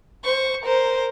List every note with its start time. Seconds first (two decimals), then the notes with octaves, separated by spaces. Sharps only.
0.24 C5 C#6
0.64 A#4 C5